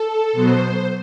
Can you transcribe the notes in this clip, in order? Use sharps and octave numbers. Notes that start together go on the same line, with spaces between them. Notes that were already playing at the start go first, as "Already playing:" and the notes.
Already playing: A4
B2 F#3 B3 C5